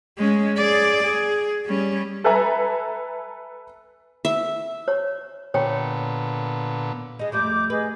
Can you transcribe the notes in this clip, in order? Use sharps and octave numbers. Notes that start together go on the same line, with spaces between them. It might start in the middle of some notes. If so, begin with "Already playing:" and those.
G#3 C#4
G#4 D5
G#4
G3 C#4
A4 B4 E5 G#5 A#5
E5
C#5
A#2 D3 B3 C#5 G5
G#3 D#4 D#5
F2 G3 A3 D6 G6
G#4 B4 D#5